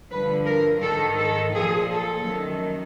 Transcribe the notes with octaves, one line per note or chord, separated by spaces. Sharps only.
G2 D3 F3 B4
A#4
G#2 D#3 A4
A4
A#2 F3 G#4
A4
F#2 D#3